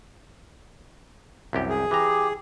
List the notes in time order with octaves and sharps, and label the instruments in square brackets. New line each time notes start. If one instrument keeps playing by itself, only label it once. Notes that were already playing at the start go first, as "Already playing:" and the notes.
[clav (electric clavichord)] C2 F#2 G4
[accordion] G#4
[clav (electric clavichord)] E3 A#5 [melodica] G4